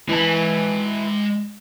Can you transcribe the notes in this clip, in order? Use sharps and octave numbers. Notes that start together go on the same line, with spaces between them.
E3 G#3 A5